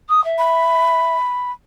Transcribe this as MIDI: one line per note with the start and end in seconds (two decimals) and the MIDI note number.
0.09 0.23 87
0.24 1.16 76
0.38 1.52 83